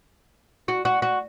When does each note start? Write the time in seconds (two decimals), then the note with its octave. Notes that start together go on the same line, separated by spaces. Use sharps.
0.68 F#4
0.85 F#4
1.02 F#4